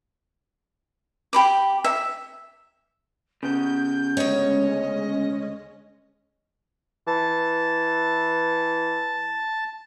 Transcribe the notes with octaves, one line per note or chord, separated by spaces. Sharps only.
G4 B5 D6
E5
C#3 B3 G6
D2 G#3 C#4 C#5 D#5
E3 A5